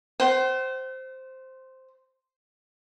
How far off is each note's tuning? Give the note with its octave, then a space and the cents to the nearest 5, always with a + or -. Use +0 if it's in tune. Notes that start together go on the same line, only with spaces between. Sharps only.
C5 +0 G5 -45